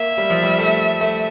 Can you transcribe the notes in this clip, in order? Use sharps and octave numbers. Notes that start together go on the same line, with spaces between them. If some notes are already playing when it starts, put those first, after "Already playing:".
Already playing: A#3 E5
G3
F3
G3
A3
A3